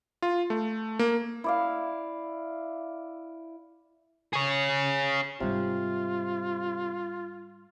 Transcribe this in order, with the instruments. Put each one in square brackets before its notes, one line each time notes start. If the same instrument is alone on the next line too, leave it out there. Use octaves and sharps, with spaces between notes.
[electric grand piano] F4
A3
A#3
[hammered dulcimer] E4 D5 F5
[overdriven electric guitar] G#4 C#5
[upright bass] G#2 G3 [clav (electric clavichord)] C3 [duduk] F4